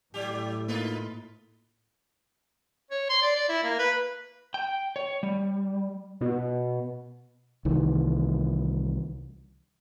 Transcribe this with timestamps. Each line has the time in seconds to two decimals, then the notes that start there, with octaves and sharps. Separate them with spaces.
0.14 A2 F#3 G4
0.68 A#3 D#4 F4 B4
2.91 C#5
3.09 C6
3.22 D5
3.36 D5
3.49 E4
3.63 A#3
3.79 B4
4.54 G5
4.96 C#5
5.23 G3
6.21 B2
7.65 C2 D#3 E3